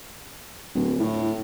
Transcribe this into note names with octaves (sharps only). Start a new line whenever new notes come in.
D1
A2